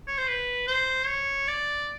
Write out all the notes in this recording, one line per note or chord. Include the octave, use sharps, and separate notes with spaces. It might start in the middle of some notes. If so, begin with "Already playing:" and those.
C#5
C5
B4
C5
C#5
D5